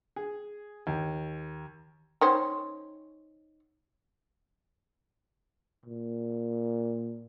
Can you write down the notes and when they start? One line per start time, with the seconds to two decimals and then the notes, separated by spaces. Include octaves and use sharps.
0.16 G#4
0.87 D#2
2.21 D#3 C#4 C5
5.86 A#2